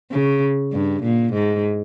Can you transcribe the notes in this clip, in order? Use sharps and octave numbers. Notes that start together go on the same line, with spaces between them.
C#3
G2
A#2
G#2